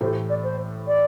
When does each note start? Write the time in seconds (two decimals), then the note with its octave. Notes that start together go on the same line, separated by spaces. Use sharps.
0.01 A2 E3 A3 E4 G4 C5
0.29 D5
0.43 C5
0.87 D5